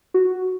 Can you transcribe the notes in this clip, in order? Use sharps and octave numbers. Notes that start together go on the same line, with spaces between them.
F#4